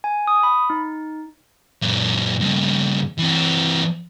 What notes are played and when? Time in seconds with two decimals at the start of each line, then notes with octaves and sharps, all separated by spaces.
0.04 G#5
0.27 D#6
0.43 B5
0.70 D#4
1.82 F#2 A#2
2.41 G2 C#3
3.19 E3 C4